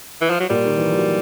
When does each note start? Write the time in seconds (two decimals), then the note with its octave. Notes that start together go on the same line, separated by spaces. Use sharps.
0.21 E3
0.30 F3
0.40 F#3
0.50 A#2 G3 A#3
0.66 D#3
0.77 E3
0.88 F3
0.98 F#3